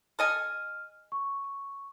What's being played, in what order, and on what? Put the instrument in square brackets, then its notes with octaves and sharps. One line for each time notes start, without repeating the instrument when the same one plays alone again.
[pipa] A4 D#5 G#5 [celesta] F6
[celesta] C#6